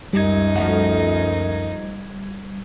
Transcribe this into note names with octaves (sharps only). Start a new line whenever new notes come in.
C#2 F#2 G3 D#4 G#6
F3 A3 F#4